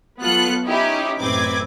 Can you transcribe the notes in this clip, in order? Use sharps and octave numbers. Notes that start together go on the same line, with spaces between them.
F#3 B3 F4 A4 F#6 C#7
C#4 D#4 E4 G4
A1 F#2 C4 B4 D6 G#6